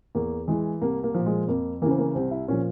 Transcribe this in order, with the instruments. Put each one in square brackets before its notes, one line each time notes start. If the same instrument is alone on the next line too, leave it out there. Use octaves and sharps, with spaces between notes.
[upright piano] E2 A#3
E3 G#3
C2 A#3
A#3
A#2 F3
G#3
F2 A#3
E3 A#3
C#3 C4
A#3
C2 C4
E4
A#2 F3 C#4